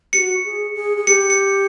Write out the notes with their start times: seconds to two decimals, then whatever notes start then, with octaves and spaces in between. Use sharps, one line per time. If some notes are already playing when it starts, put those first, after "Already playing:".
0.13 G4 C#7
0.18 F#4
0.45 G#4
0.75 G#4
0.97 G#4
1.07 G4 C#7
1.30 C#7